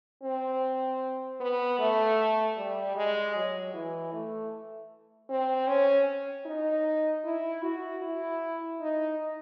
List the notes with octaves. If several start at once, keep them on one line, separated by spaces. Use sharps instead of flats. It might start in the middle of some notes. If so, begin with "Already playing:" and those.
C4
B3
A3
G3
G#3
F#3
E3
A3
C4
C#4
D#4
E4
F#4
E4
D#4